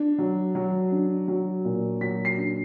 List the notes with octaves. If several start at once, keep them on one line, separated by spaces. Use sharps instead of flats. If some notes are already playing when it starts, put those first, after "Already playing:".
Already playing: D4
F#3
F#3
D4
F#3
A#2
F#3 B6
C7
D4